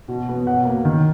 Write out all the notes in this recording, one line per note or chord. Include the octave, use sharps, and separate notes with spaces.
B2
B3
B2 F#5
A#3
D#3